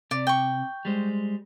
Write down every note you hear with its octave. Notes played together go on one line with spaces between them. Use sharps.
C3 D5
G5 C#6
G3 G#3 C5